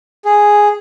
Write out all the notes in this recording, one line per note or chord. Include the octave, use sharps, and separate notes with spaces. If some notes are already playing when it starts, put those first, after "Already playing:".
G#4